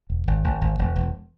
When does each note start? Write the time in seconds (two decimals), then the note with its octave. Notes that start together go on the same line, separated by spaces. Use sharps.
0.10 E1
0.27 G#1
0.44 G#1
0.61 G#1
0.79 E1
0.96 E1